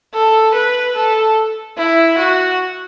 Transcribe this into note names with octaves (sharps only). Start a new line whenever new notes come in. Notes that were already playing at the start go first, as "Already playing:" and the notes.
A4
B4
A4
E4
F#4